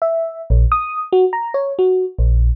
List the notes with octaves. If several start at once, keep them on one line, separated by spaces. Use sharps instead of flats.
E5
A#1
D#6
F#4
A#5
C#5
F#4
A#1